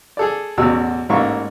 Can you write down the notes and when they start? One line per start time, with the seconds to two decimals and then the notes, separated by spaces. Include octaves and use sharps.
0.17 G#4 A4 D5
0.58 A1 E2 B2 F#4 E6
1.09 A1 G#2 A#3 E4 C#6